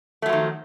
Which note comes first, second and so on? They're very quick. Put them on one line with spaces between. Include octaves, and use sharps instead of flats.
A3 F#3 F3 D#3